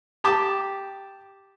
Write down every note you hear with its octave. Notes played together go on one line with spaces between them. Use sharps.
G4 A5 D6